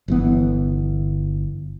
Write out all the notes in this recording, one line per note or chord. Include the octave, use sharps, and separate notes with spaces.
G1 E3 B3